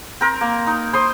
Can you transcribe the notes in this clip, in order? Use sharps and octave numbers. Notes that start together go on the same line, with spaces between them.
C4 A#4
A#3
D#4
C5 C6 D#6